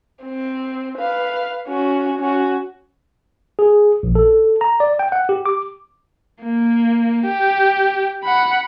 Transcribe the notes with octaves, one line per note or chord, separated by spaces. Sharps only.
C4
B4 F5
C#4 F#4
C#4 F#4
G#4
A#1
A4
A#5
D5
G5
F#5
G4
D6
A#3
G4
F#5 B5